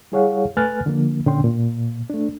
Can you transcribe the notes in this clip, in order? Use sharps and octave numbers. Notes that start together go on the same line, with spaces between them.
G3 E4 G#4 C#5 F5 F#5
A3 B4 G#5 F6 F#6 A6
D3 F3 A#3
A#2 D3 C#4 G5 C6
A#2
A3 D4